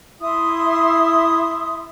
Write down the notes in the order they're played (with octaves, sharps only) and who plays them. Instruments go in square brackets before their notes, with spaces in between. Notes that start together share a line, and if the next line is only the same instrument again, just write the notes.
[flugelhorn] E4 [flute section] E5 C6 D#6